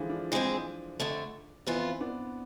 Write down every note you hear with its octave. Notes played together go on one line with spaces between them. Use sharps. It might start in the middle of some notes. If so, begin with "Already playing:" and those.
Already playing: D3 E3 F3 G#3
D4 F4
E3 G#3 C4 D4 F4 G#4
F2 D3 A3
F2 E3 B3 C4 E4 F4
B3 D4